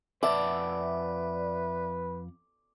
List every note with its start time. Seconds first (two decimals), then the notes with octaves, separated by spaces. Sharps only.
0.23 F2 B4 D5 E5 F#5 A5 D6